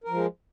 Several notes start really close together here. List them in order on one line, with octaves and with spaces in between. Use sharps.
A#4 F3 G#3